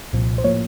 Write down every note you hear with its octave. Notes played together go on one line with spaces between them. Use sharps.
C2 A#2 F3
C5
A2 F3 A#3 C#5